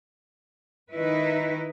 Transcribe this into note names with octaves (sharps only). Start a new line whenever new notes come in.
D#3 D#4 E4 B4